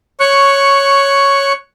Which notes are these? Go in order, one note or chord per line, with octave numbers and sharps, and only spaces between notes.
C#5 C#6 F#6